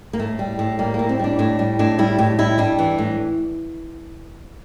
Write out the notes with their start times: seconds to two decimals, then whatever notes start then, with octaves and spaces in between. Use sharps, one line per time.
0.13 A#3
0.19 A2 A3
0.39 G3
0.59 A2
0.79 G3 A#3
0.94 A#3
0.99 A2
1.09 C4
1.19 G3 D4
1.39 A2 D4
1.59 G3
1.79 A2 D4
1.99 G3 E4
2.18 A2 G4
2.39 G3 E4
2.58 G3 D4
2.79 E3
2.98 A2